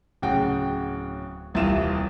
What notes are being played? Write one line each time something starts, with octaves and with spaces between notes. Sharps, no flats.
D1 C#3 F#4 G5
D#1 C2 E3 E4 F4 E7